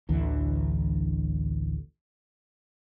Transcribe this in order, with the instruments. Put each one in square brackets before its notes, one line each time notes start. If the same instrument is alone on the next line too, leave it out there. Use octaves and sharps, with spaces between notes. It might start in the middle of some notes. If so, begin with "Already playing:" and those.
[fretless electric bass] A1 D2 D3 E3